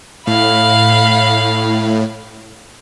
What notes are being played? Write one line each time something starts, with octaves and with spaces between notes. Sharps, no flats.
A2 F5 B5